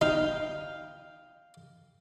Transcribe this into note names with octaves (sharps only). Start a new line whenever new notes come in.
D#4 F5 G5